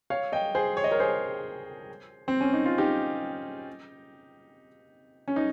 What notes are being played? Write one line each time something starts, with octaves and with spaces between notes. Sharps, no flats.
C#5 F5
D#5 G5
G#4 C5
C#5
D#5
A#4 C#5
G#4 C5
C4
C#4
D#4
F4
D#4 G4
C#4
D#4